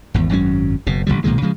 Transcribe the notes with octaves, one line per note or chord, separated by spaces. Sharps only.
G#1 E2
G#1 F#2 F#3 C#4
F#1 B2
A1 G2 D3 G3
B1 A#2 D#3 G#3
C#3 F3 G#3